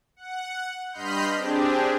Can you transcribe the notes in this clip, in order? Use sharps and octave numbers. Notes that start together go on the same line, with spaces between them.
F#5
G2 D#5 B5 C6 F6 G6
C4 D4 G4 G#4